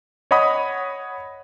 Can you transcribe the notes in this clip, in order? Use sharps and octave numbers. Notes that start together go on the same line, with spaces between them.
C#5 D#5 F#5 B5 D#6